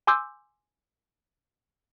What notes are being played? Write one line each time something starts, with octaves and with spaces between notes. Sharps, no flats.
G#5 C6 D6 E6 G6